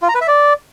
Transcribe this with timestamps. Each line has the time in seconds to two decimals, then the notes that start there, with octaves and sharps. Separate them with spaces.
0.02 F4
0.09 A#5
0.15 B4
0.21 E5
0.28 D5